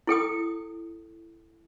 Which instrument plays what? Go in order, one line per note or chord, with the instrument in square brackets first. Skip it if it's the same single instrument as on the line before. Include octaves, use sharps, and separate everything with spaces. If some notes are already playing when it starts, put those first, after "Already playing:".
[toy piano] E4 A4 G5 D#6